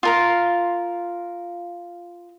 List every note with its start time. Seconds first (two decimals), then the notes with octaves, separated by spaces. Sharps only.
0.03 F4 A#4 F5